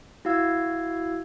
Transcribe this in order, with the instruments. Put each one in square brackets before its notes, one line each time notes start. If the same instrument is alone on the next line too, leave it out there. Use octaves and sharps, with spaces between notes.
[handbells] E4 F#4 F5 E6 G#6